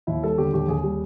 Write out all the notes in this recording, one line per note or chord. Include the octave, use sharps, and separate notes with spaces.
D#2 E4
G3 A4
D3 G4
D#2 G4
D#2 G#4
G3